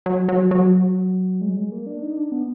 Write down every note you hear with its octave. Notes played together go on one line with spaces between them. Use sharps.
F#3
F#3
F#3
G#3
F#3
G#3
A#3
D4
D#4
D4
B3